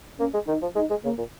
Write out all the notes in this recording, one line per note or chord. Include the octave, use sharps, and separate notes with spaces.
A#3 C#4
G#3
D#3 D#4
F3
G#3 D#4
G#3
C#3 A#3
A#2